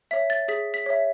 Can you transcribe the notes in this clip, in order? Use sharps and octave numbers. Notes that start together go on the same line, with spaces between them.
C#5 E5 B6
A6
G#4 B6
B6
C#5 E5